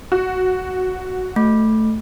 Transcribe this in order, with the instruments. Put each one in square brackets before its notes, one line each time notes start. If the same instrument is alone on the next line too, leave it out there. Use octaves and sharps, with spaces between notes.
[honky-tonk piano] F#4
[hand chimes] A3